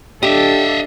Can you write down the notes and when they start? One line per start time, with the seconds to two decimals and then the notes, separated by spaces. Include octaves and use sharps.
0.23 D4 G4 A4 D#5 E5